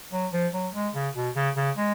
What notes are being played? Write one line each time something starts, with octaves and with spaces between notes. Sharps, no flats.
F#3
F3
F#3
G#3
C#3
B2
C#3
C#3
G#3